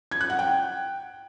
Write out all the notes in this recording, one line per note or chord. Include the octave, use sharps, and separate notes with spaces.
G#6
F#6
F#5
G5